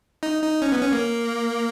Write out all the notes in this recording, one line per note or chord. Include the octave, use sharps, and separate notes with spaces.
D#4
D#4
C#4
B3
C#4
A#3